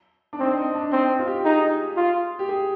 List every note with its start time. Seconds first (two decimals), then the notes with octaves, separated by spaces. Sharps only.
0.33 D4
0.39 C4 D#4
0.58 D#4
0.75 D4
0.92 C4 D#4
1.19 F4
1.27 G4
1.45 D#4 G#4
1.97 F4
2.39 G4
2.49 G#4